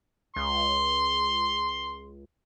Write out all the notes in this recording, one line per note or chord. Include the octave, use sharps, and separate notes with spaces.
C#2 C6